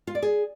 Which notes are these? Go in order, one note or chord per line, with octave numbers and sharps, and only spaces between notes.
F4
D5
G#4